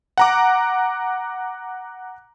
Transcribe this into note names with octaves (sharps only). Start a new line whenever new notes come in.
F#5 A#5 D6